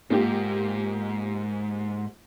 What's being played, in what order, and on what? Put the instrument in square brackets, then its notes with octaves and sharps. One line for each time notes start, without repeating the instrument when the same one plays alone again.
[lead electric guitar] G#2 [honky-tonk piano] A#3 F4 G4